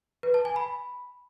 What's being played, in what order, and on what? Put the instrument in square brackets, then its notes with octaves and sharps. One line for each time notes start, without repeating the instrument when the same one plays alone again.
[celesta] B4
A5
G#5
B5